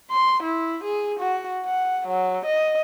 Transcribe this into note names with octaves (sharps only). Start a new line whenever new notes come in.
C6
E4
G#4
F#4
F#5
F#3
D#5